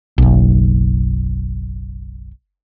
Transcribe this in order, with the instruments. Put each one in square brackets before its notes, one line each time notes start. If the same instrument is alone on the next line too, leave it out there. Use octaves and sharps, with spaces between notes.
[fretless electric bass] F#1 B1